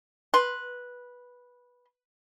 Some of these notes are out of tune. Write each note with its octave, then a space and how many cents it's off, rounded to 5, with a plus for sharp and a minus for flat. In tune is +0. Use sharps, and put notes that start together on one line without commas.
B4 -10 C6 +0